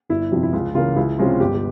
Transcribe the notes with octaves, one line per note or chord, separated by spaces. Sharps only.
G1 E4
F2 C3 F3
E4
C#2 F4
C#3 E3 A#3 F4
C#2 E4
C3 F3 G#3 C#4 F4
G1 G4
G4